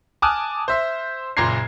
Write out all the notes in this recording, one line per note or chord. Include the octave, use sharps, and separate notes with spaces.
G#5 A5 D6 D#6 F6 F#6
C5 E5 C6
F#1 A#2 A#5 C6 G#6 C7